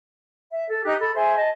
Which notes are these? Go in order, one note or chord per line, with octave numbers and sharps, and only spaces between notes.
E5
A4
D#4 G4 D#6 F#6
A4 B5
G#4 C5 E5 C6
D#5 A5